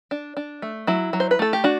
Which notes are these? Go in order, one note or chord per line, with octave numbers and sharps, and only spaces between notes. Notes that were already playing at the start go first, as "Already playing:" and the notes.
D4
D4
A3
F#3 E4
F#3
C5
B4
A3 A4
G4
D4 F#4